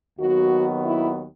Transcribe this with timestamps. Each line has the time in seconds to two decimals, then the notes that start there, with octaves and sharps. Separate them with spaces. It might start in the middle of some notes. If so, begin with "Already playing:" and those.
0.19 D#2 D#3 F#3 B3 F#4
0.85 E4